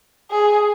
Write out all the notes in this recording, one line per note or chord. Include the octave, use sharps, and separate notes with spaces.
G#4